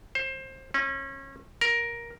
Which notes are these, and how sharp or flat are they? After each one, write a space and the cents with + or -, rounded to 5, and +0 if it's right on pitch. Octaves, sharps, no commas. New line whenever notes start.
C5 +25
C#4 -30
A#4 +10